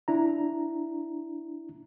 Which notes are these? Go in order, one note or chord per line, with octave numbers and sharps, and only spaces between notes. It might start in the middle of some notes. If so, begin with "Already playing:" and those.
D4 E4 A#5